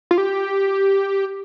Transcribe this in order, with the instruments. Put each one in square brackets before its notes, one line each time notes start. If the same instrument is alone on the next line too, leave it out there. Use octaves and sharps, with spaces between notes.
[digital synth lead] F4
G4